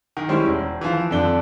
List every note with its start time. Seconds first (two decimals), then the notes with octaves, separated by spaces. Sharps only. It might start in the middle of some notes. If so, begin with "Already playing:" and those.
0.17 D#3
0.29 G3 G#3 C#4 E4 G#4 C5
0.47 E1
0.81 E3 F3
1.11 F2 D3 D4 G7